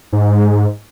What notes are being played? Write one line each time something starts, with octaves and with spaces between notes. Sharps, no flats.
G#2